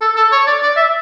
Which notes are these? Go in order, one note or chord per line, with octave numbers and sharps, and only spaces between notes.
A4
A4
C#5
D5
D5
E5